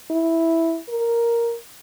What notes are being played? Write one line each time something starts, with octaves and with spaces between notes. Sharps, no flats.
E4
A#4